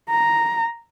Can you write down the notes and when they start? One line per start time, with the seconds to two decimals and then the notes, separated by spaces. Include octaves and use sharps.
0.10 A#5